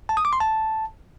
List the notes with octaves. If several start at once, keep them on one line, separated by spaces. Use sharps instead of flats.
A5
D#6
D6
C6
A5